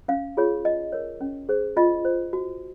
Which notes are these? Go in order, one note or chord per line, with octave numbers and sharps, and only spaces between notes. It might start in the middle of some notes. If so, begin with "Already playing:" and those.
C#4 F5
F4 G#4 C#5
D#4 D#5
A#4 C#5
C#4
G#4 C5
F4 D#5
C5
F#4